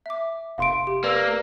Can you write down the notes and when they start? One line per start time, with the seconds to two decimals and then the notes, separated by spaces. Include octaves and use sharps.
0.06 E5 D6
0.58 F1 F5 C6 D7
0.87 G4
1.04 A#3 B4 D5 E6